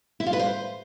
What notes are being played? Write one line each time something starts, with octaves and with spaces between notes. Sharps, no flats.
E4
F4
B4
C5